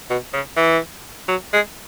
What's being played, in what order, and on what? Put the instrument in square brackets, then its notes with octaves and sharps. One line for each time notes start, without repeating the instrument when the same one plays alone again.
[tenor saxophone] B2
C#3
E3
F#3
G#3